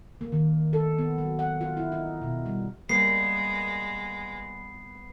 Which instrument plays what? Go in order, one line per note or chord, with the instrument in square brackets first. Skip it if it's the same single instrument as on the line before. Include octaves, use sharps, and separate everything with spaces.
[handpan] A#3
D#3
A4
B3
F#3
F#5
F4
E4
D#4
B2
G3
[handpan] G3 A#3 [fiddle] G#3 [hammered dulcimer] B3 [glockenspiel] C7